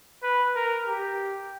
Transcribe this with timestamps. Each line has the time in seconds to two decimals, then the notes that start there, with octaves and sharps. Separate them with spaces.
0.23 B4
0.55 A#4
0.87 G4